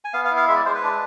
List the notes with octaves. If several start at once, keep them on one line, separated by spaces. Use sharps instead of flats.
G#5
B3 F5
F5
E4
F5
G#3 E5
D5
G#3 C5
B4
D4